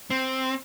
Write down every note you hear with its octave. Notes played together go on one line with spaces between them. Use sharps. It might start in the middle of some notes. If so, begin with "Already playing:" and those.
C4